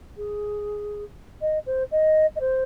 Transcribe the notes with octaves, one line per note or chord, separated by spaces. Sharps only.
G#4
D#5
C5
D#5
D#5
C5